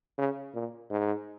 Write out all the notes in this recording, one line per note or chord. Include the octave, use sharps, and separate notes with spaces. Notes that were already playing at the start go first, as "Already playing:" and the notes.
C#3
A#2
G#2